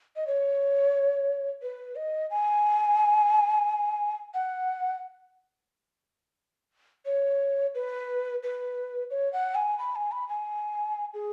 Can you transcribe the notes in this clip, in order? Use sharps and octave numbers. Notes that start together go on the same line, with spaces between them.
D#5
C#5
B4
D#5
G#5
F#5
C#5
B4
B4
C#5
F#5
G#5
B5
G#5
B5
G#5
G#4